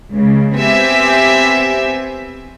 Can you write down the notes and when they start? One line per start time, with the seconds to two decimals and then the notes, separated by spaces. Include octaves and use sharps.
0.12 C#2 C#3
0.57 B3 C4 G4 C5 E5 G#5